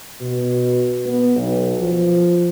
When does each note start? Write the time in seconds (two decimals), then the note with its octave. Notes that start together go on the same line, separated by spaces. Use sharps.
0.21 B2
1.05 B3
1.36 B1
1.81 F3